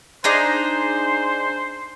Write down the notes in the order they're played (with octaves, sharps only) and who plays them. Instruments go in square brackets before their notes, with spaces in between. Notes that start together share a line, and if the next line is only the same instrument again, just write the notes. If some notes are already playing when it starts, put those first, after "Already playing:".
[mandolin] D4 D#4 G#4 [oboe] C5